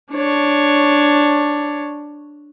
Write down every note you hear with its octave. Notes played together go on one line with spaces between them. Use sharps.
D4 C#5